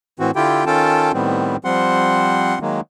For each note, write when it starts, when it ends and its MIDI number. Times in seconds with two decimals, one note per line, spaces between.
0.19 0.31 45
0.19 0.31 52
0.19 0.31 60
0.19 0.31 66
0.36 0.64 50
0.36 0.64 64
0.36 0.64 65
0.36 0.64 67
0.36 0.64 79
0.66 1.12 51
0.66 1.12 61
0.66 1.12 65
0.66 1.12 69
0.66 1.12 79
0.66 1.12 81
1.14 1.57 45
1.14 1.57 51
1.14 1.57 55
1.14 1.57 59
1.14 1.57 60
1.65 2.59 53
1.65 2.59 55
1.65 2.59 60
1.65 2.59 78
1.65 2.59 84
2.61 2.80 51
2.61 2.80 54
2.61 2.80 56
2.61 2.80 58